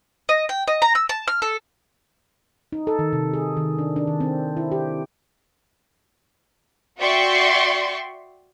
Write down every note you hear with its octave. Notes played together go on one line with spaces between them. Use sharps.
D#5
G5
D#5
A#5
E6
A5
F6
A4
D#4
A4
D#3
C3
G#4
D#3
D4
D4
D#3
C4
E4
G4
F#4 D5 E5 G5 C6 C#6